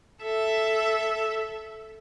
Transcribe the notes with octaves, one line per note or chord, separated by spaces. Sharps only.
A4 E5